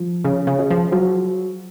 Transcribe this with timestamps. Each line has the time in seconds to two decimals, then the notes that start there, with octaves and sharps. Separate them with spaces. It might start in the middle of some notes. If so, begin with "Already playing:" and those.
Already playing: F3
0.25 C#3 C#4
0.47 C#3
0.59 G#4
0.71 F3
0.92 F3 F#3